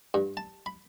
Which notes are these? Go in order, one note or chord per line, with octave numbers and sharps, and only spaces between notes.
G2
A5
B5